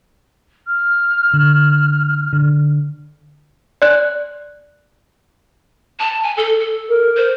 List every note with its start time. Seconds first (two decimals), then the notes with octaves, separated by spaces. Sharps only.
0.67 F6
1.33 D3
2.33 D3
3.82 D5 F#6
6.00 A5
6.23 G#5
6.37 A4
6.60 A4
6.89 A#4
7.17 C5